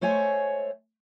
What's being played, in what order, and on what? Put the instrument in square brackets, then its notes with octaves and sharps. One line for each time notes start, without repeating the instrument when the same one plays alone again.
[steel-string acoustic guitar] G#3 A3 C5 C#5 G#5